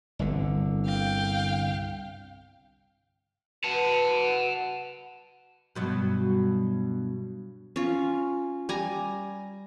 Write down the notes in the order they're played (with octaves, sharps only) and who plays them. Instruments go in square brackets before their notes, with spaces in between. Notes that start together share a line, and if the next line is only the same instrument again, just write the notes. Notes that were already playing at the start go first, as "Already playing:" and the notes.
[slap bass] G1 C2 D3
[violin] F5 G5
[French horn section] F#4 B4 [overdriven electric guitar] F#5 A5
[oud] G2 B2 F#3
[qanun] C#4 F4
G3 G#5 A#5